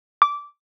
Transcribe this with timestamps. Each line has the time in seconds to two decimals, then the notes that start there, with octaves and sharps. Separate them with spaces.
0.22 D6